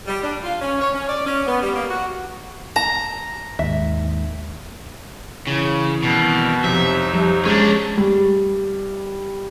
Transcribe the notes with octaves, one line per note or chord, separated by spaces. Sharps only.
G3
D4
F4
C#4
C#5
C#4
D5
C#4
B3
G3
A#3
F#4
A5 A#5
D#2 G#2 E5
C#3 E3
B2 D#3 G3 C4
F2 C3 F3 F#3 D#4 E5
F3 G3
G#3 C#4 D4
G3